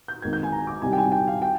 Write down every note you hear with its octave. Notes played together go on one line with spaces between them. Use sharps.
G6
G#1 G#2 D#3 A#3 G#6
G6
G#5
A#5
D6
C2 C3 D#3 G3 G#5
G5
G#5
G5
F5
G5